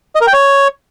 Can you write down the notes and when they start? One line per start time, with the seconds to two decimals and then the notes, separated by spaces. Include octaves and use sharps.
0.15 D#5
0.21 A#4
0.27 G5
0.33 C#5